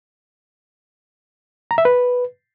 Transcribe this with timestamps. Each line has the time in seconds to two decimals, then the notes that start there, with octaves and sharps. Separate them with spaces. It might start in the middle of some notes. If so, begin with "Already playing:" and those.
1.71 A#5
1.78 E5
1.85 B4